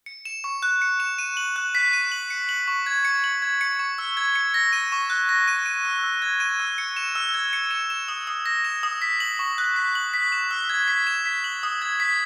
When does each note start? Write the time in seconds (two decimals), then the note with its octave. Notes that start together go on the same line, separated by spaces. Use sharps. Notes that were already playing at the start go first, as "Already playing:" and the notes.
0.06 C#7
0.25 E7
0.44 C#6
0.63 F#6
0.82 C#7
1.00 E7
1.18 D#7
1.37 F#7
1.56 F#6
1.75 B6
1.93 D#7
2.12 F#7
2.30 C#7
2.49 F#7
2.68 C#6
2.86 G#6
3.05 C#7
3.24 F#7
3.42 G#6
3.61 C#7
3.79 C#6
3.98 E6
4.17 G#6
4.35 C#7
4.54 A#6
4.73 D#7
4.92 C#6
5.10 F#6
5.29 A#6
5.48 D#7
5.66 D#7
5.85 E6
6.04 E6
6.22 G#6
6.40 D#7
6.60 E6
6.78 C#7
6.97 E7
7.15 E6
7.34 G#6
7.53 C#7
7.71 E7
7.90 E7
8.08 D#6
8.27 D#6
8.46 A#6
8.64 E7
8.83 D#6
9.02 B6
9.20 F#7
9.39 C#6
9.58 F#6
9.76 B6
9.95 F#7
10.14 B6
10.32 E7
10.51 E6
10.70 G#6
10.88 B6
11.07 E7
11.26 B6
11.44 F#7
11.63 D#6
11.82 G#6
12.00 B6